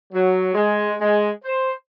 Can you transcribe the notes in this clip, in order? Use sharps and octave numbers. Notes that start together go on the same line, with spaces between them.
F#3
G#3
G#3
C5